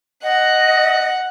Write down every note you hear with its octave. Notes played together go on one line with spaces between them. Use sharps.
D#5 F#5